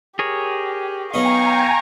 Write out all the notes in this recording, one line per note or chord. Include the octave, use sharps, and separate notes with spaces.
G4 G#4 A#4 C#5
F#3 B3 D#4 F5 G5 G#5 A#5 C#6